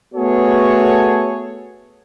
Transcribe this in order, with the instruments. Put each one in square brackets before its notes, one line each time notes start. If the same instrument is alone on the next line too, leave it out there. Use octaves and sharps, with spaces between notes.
[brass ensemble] A3 B3 F#4 G#4 A4 C#5